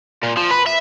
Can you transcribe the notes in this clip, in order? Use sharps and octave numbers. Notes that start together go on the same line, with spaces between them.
A#2
F3
B4
E5